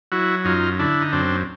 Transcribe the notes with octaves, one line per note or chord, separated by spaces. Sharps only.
F#3 E4 F#4
F#2 D#4 F4
D3 D4 E4
D#4
F#2 C4 D4